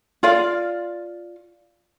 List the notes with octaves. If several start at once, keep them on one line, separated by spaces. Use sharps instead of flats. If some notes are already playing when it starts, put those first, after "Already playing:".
F4 D5 F5